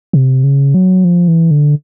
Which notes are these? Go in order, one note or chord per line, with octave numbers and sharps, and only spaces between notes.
C3
C#3
F#3
F3
E3
D3